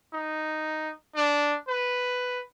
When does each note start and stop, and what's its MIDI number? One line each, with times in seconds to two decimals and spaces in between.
0.14 0.92 63
1.16 1.57 62
1.68 2.40 71